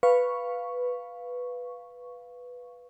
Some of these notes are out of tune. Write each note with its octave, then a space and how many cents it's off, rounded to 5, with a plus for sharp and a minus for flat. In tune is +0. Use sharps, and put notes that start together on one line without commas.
B4 +0 F5 +0 C#6 +0